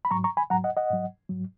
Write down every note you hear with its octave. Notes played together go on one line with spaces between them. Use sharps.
B5
G#2 F#3 A#5 C#6
A#5 C#6
G#5 B5
G#2 F#3 F#5 A#5
D#5 F#5
D#5 F#5
G#2 F#3
G#2 F#3